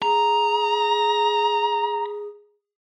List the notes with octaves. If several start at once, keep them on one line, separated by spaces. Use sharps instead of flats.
G#4 A#5